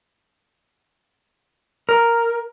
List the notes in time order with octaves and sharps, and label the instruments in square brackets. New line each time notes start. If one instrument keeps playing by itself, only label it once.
[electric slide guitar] A#4